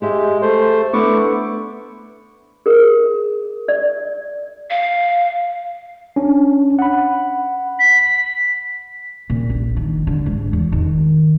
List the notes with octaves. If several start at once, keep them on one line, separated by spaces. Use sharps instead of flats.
G#3 G4 E5 G5
A3 C5
A3 B3 D4 E4 C#6 D6
G#4 A#4
D5
F5
C#4 D4
F#5 B5
B6
A#2
A#1
D#3
D3
G#2
E2
D#3